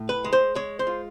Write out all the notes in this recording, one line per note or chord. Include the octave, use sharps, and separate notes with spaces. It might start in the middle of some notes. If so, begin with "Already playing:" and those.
Already playing: A2
B4
G#3
C5
G#3 C#5
C5
F4